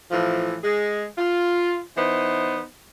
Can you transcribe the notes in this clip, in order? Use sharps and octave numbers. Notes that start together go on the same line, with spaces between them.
A2 E3 F3
G#3 G#4
F4
E3 B3 D#4 C5